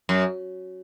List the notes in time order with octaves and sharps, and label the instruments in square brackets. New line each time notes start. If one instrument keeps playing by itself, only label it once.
[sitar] F#2